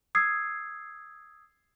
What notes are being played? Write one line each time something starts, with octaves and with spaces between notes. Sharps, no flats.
D#6 E6 G#6 C7